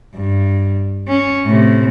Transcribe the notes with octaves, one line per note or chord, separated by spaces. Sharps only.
G2
C#4
A2 C3